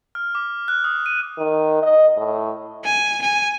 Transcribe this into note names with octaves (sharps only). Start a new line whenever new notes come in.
F6
D6
F#6
D#6
D#7
D#3
D#5
A2
G#5
G#5